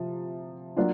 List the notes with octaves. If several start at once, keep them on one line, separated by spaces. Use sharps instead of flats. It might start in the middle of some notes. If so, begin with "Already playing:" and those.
Already playing: C3 F3
F#3 A#3 D4 F4